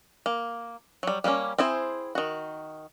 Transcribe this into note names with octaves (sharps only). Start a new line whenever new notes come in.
A#3
F#3 G3
G3 A#3 B3 C#4
C4 E4 G#4 C5
D#3 F#4